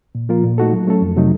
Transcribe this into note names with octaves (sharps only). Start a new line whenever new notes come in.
A#2
F3 A#3 F4 A#4
A#2
A3 D#4 F#4 A4
F#3
A3 C#4 A4
F2
C3 F#3 A3 D#4